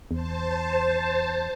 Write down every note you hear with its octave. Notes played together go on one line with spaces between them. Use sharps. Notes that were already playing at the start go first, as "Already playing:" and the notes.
E2 C5 A5